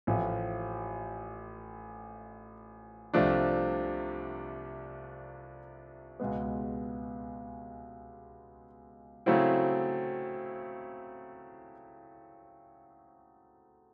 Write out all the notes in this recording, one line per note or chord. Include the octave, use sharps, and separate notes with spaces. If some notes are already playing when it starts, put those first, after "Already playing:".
A1 A2 F3
C2 C3 F3 A3 D4
C#2 B2 G#3 B3
C#3 F#3 A3 C4 E4